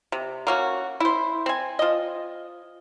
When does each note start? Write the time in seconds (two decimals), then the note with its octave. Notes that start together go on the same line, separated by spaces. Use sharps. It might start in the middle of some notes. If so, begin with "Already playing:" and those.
0.12 C3
0.47 A#3 C#4 F#4
1.00 E4 C5
1.46 C4 G#5
1.79 F3 D#5